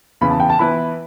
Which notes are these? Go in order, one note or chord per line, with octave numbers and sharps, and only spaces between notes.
E2 C#3 E3 B5
A5
G5
A5
E3 B3 E4 B4 B5